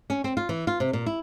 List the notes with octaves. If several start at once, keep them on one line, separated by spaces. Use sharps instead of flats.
C#4
C4
F4
E3
F4
C3
A#2
E4